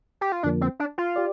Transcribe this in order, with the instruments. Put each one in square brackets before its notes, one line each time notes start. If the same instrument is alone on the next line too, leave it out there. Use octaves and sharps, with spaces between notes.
[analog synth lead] G4
F4
[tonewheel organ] F2 D3 F3 A#3 [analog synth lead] D4
[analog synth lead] C4
D4
F4
[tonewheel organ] G4 D5